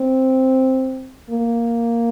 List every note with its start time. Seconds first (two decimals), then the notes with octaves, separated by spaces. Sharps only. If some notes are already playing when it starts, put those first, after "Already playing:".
Already playing: C4
1.30 A#3